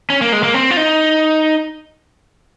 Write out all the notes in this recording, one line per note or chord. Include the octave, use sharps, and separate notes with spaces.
C#4
A#3
G#3
A#3
C4
F4
D#4